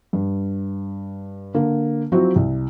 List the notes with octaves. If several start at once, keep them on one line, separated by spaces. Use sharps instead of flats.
G2
D3 A#3
F3 F#3 C4 E4 F#4
C2